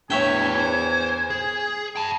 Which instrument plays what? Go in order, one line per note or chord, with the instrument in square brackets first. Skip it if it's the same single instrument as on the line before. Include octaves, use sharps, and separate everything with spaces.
[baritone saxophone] E2 [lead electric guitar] A2 D4 [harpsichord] C#5 E5 G5 [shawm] G#5
[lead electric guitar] C5
G#4
G5 A5